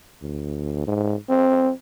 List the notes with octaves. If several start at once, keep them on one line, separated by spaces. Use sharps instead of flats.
D2
G#2
C4